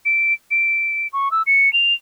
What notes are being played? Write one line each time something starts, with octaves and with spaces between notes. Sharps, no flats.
D7
D7
C#6
E6
C#7
F7